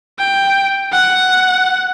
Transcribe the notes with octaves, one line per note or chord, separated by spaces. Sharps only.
G5
F#5